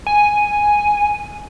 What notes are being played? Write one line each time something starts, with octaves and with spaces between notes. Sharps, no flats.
G#5